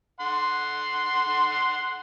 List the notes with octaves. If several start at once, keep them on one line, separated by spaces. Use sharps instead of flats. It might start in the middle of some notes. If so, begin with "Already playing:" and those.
F#5 C6